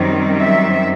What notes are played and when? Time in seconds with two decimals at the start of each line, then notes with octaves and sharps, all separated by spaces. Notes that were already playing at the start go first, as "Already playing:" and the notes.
Already playing: F#2 D#3 G3 C4
0.39 E5